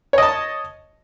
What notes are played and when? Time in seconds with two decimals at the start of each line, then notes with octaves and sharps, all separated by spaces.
0.13 C#5
0.18 D#5
0.23 A5